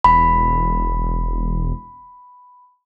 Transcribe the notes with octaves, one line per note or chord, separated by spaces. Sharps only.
E1 B5